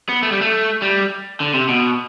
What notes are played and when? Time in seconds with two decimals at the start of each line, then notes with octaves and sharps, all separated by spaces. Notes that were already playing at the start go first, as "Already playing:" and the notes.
0.09 B3
0.23 A3
0.32 G3
0.41 A3
0.82 G3
1.40 D3
1.54 C3
1.69 B2